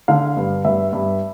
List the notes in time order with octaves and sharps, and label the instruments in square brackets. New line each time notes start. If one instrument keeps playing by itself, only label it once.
[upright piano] D3 F5
G2
G2 E5
G2